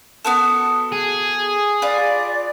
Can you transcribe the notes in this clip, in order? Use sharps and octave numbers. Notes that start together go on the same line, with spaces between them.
B3 F#4 A4
G#4
F4 B4 D5